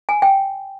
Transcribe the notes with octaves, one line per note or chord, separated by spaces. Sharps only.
G#5
G5